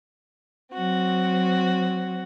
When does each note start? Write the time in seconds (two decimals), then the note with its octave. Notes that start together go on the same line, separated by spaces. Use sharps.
0.73 F#3 C4 F#4